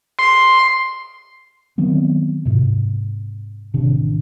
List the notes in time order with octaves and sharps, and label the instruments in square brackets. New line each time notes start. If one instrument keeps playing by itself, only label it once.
[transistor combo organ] C6
[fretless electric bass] D#3 F#3 B3 C4
G#2 C3
A1 C3 D#3 D4